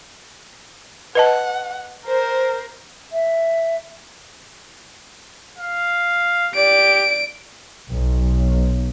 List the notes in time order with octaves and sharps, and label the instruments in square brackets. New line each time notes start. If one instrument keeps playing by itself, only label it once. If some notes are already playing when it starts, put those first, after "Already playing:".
[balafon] B4 D#5 A5 [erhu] F#5
[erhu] A#4 [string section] C5
[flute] E5
[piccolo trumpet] F5
[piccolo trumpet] G4 [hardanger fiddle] D5 [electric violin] D7
[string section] B1